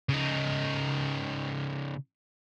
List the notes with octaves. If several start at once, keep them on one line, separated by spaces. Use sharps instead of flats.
C#3 D#4